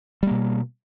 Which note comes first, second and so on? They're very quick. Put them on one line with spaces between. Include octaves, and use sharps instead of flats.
G3 A#3 B2